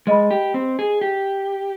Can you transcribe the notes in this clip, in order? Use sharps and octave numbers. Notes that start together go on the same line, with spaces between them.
G#3 B4 D#5 B5
G4
C4
G#4
G4